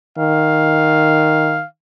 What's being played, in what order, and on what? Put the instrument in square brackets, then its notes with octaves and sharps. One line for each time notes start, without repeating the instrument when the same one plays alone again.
[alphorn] D#3 [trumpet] F5